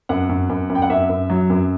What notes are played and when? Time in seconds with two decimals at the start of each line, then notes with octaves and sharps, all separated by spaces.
0.09 F#2 F#5
0.29 F#2
0.49 F#2
0.70 F#2
0.75 G5
0.82 F#5
0.90 F#2 E5
1.09 F#2
1.30 F#3
1.50 F#2